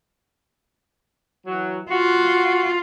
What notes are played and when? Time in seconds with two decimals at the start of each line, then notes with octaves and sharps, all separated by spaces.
1.46 E3 F#3
1.91 F4 F#4